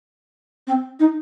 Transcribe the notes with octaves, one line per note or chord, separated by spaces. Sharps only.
C4
D#4